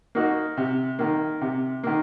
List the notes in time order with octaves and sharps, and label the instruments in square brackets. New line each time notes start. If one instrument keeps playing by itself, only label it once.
[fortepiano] A#3 D#4 F#4
C3
D#3 A#3
C3
D#3 A#3